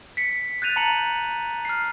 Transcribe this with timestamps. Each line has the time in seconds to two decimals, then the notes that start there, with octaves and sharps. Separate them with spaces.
0.17 B6 C#7
0.62 F#6 G6 A6 D#7 F7
0.76 A5 A#5 C#7 F#7
1.65 F6 C7